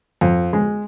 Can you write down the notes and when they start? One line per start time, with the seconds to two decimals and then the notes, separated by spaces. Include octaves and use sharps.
0.21 F2
0.53 G#3